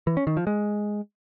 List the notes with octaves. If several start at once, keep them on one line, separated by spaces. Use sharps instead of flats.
E3
C#4
D#3
F3
G#3